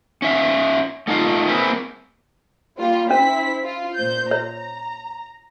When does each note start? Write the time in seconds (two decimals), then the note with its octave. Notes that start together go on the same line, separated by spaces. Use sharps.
0.22 C#4 E5 F5
1.07 A3 D#4 F4 F5
1.49 A#3 C4 E4 G#4 B4
2.79 G3 A#3 F4
3.11 C#4 E4 C5 B6
3.64 F4
3.95 A#2 C5 G6
4.31 C#5 A#5